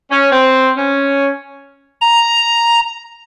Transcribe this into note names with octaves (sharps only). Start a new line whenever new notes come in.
C#4
C4
C#4
A#5